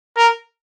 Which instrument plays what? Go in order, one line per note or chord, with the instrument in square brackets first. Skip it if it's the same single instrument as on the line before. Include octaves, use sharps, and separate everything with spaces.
[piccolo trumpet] A#4